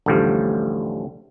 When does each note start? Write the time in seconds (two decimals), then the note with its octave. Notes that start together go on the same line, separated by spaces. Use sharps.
0.06 A1 D2 A2 D3 F3 G3